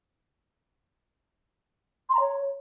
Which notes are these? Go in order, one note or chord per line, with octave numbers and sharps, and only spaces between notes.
C6
A#5
C#5